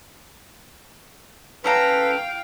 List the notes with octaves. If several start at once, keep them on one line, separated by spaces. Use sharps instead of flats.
C#4 A4 B4 F5 G5 A#5